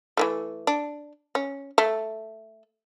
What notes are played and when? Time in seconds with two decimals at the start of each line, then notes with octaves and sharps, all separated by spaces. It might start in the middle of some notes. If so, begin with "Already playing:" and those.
0.17 E3 F3 A3
0.67 D4
1.35 C#4
1.78 A3